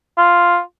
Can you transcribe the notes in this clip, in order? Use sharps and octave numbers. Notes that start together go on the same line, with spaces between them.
F4